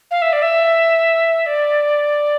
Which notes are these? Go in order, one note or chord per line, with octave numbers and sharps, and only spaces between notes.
F5
E5
D5
E5
D5